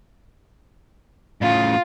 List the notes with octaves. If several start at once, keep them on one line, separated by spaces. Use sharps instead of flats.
A2 C#3 F4